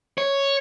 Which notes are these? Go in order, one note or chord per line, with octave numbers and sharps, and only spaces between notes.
C#5